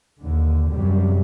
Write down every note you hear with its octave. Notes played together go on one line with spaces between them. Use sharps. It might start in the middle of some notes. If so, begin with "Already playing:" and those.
D#2 D3
F#2 C3 F#3 G3